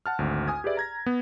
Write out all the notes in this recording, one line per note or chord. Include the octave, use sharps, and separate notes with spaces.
F#5 A5 F6
G#1 D2
G#5 D#6 G#6
G4 G#4 B4 D5 E5
A#5 G#6 A#6
B3